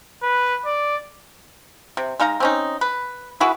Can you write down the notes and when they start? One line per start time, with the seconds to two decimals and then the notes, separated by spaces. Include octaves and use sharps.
0.23 B4
0.65 D5
1.97 C3
2.20 G#3 D#4 F5 A#5
2.40 C4 C#4 D#4
2.81 B4
3.40 E4 F#4 G#4 B4